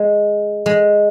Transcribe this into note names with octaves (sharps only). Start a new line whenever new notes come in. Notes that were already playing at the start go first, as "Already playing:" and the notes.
Already playing: G#3
G#3